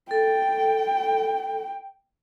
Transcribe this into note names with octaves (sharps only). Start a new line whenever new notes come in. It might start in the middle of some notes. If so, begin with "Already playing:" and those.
A4 G5